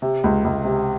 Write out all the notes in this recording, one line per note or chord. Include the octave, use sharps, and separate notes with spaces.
C3
C#2
C#2
C3